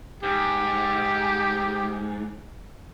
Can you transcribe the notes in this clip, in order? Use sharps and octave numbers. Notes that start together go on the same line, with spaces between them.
G#2 G4